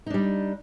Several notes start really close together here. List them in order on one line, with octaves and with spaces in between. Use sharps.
D#4 D4 G3